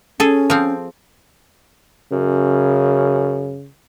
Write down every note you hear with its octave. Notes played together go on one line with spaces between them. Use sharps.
C#4 G#4 A4
F3 C4
F#2 C#3